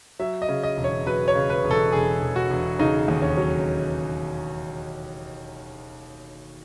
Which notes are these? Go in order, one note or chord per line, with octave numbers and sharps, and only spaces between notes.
F#3 E5
D#5
C#3
D#5
E1
C#5
F#3 B4
C#5
C#3
B4
E1
A4
E1 G#4
E1
F#4
E1
C#3 D#4
D#2
C#4
F#3